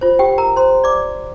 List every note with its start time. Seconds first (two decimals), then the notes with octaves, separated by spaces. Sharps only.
0.01 F4 C5
0.19 G4 G5
0.38 A#4 A#5
0.56 C5 C6
0.84 D5 D6